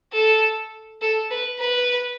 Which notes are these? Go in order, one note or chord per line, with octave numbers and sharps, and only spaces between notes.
A4
A4
B4
B4